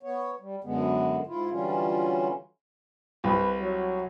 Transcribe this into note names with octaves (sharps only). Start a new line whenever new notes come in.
B3 C#5
G3
F#2 D3 G#3 B3
G#2 E4 F4
D3 E3 F#3 G3 C#4 F4
C2 B4
F#3